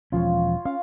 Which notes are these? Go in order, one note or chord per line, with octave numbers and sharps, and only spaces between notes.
E1 F3 C#4 F4 C#5
C#4 F5